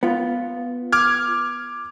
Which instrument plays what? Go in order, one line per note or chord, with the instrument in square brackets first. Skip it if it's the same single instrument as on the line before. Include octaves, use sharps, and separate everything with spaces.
[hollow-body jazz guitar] B3 F4
[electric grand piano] D6 F6 G#6